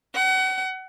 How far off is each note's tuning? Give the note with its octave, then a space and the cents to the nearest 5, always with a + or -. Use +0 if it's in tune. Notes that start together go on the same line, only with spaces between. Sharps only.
F#5 +35